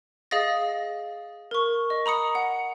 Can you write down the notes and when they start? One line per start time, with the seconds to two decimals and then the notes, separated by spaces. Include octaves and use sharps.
0.31 G#4 D#5 F5 D#6 A6 A#6
1.51 A#4 C#6
1.90 D#5
2.06 A#5 B5 D#6 C#7
2.35 F#5